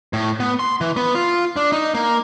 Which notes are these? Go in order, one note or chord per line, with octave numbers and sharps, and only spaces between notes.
A2
B3
C6
E3
B3
F4
D4
D#4
A#3